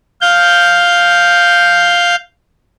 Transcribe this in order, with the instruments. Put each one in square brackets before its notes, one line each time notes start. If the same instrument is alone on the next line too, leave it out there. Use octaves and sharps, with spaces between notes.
[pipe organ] F5 G6